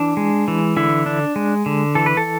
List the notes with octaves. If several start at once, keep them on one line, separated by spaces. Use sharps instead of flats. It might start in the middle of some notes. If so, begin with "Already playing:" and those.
Already playing: E3 D4
G#3
E3
D3 E4
D4
G#3
D3
E3 A4
B4
A4